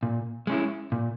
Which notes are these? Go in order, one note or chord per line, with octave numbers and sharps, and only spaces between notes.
A#2
G#3 C#4 E4
A#2